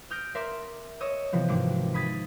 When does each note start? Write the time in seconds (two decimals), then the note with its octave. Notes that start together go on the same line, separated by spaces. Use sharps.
0.10 D#6 F6 G6 A#6 D7
0.35 A#4 D5 E5 C6 E6
1.00 C#5 D#5 D#6 E6
1.32 C3 E3 F3 B3
1.48 G#1 D6
1.94 B5 D#6 G#6 A6 B6